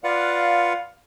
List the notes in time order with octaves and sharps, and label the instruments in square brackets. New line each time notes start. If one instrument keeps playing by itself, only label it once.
[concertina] F4 B4 F#5 [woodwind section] D5 F5